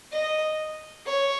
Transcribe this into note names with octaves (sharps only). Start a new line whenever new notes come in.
D#5
C#5